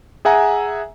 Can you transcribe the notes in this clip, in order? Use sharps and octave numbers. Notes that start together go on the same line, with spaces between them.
G#4 E5 F#5 G#5 A#5